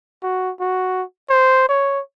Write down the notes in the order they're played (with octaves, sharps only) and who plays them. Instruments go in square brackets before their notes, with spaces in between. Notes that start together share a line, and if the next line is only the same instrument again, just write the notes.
[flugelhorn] F#4
F#4
C5
C#5